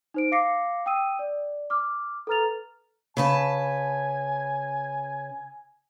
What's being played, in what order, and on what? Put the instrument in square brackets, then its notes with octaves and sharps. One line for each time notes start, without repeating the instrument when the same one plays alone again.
[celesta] D#4 C5 D7
F5 D6 A#6 C7 C#7
G5 D#6 E6 D#7
D5
D6 F6
A4 B4 A#5 F6 A6 F7
[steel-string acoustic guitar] C#3 B4 A5 [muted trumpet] G#5